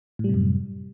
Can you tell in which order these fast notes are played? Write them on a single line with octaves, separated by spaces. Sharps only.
A2 G3 C3 F#2